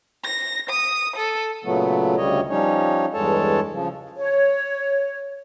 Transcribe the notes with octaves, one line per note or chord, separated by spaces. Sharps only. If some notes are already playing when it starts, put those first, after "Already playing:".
A#6
D#6
A4
A#2 C#3 F#3 A3 B3
D2 C#3 G3 C#5 D#5
F3 G3 C#4 D#4 C#5
E2 G2 G#3 A4 C#5 A5
C#3 F3
C#5